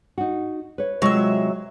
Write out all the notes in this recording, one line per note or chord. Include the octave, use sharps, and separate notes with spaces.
D#4 F#4
B4 C#5
C3 F#3 G#3 F4 E5